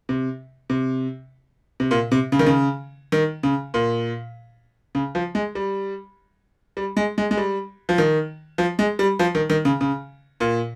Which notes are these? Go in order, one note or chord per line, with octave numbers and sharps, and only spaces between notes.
C3
C3
C3
A#2
C3
C#3
D#3
C#3
D#3
C#3
A#2
C#3
F3
G#3
G3
G3
G#3
G#3
G#3
G3
F3
D#3
F3
G#3
G3
F3
D#3
D#3
C#3
C#3
A#2